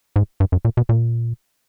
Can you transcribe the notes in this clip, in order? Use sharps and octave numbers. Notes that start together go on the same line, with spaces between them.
G#2
G2
F#2
A#2
B2
A#2